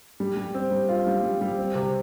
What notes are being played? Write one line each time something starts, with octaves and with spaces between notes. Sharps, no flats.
G3
G3
C4
G3
F4
G3
G3
G3
C4
C3